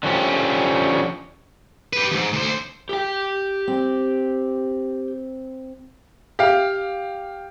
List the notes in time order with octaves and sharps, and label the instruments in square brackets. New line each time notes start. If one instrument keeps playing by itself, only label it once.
[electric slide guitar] D3 F3 C#4 G4
[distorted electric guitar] G4 B4
E2 G#2
D2 C5
[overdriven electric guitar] G4 G5
[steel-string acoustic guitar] C4
[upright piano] G4 F5